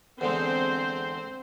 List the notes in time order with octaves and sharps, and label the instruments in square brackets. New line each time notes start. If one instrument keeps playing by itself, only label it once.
[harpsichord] E2 D3 G#3 [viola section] C4 C5